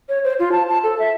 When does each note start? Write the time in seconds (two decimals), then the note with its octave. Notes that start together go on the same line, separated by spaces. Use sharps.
0.09 C#5
0.24 C5
0.39 F4
0.52 A5
0.68 A5
0.83 A4
0.99 E5